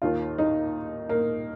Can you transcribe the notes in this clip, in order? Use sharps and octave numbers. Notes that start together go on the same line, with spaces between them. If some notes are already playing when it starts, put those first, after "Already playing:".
D#2 D#3 F4
D#4
A#3